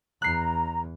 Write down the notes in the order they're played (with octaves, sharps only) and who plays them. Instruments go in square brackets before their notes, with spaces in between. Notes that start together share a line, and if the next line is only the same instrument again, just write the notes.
[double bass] E2 [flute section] A#5 [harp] F#6 C7